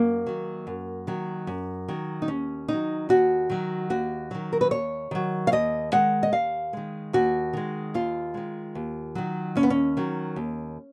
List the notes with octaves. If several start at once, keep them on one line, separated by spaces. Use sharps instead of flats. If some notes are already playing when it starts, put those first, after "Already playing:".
Already playing: F#2 A#3
D#3 F#3
F#2
D#3 F#3
F#2
D#3 F#3
D#4
D#2 C#4
D#3 F#3 D#4
D#2 F#4
D#3 F#3
D#2 F#4
D#3 F#3
A#4
B4
D#2 C#5
D#3 F#3
F5
D#2 D#5
D#3 G#3 F#5
D#5
D#2 F5
D#3 G#3
D#2 F#4
D#3 G#3
D#2 F4
D#3 G#3
D#2
D#3 F#3
D#2 C#4
B3
C#4
D#3 F#3
D#2